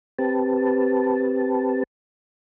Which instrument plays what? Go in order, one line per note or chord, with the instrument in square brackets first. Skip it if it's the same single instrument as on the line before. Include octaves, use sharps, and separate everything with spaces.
[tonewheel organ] C4 G4 B4 A5